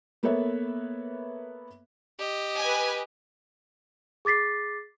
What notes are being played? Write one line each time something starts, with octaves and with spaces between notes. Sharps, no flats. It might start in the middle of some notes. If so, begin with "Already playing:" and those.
A#3 B3 A4 B4 C#5 E5
G4 D#5
B4 G#5
G#4 D6 A6 B6 C7